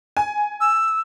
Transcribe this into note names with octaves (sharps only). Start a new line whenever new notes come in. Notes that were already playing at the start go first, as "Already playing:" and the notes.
G#5
E6